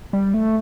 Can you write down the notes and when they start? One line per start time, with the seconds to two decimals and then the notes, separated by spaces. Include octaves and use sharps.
0.13 G3
0.34 A3